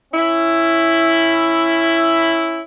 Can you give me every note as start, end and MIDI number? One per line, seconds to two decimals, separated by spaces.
0.13 2.60 61
0.13 2.60 64